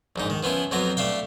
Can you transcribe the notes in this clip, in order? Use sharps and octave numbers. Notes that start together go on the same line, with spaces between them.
A#1 G#2 D#4
D#3
F3 B3 C#4 E4
F2 F3 F#3 B3 A#5
A3 D4 F5 G5